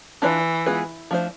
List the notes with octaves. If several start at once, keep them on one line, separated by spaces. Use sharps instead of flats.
E3 D4 F4 B4 D5
G#3 B3 F4 G#4 B4
F3 A3 D4 G#4 C5